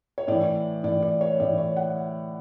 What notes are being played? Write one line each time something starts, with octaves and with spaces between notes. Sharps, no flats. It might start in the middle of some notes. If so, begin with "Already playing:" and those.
C#5
A2 E3 D5
A2 E3 D5
D5
C#5
A2 E3 D5
C#5
F#5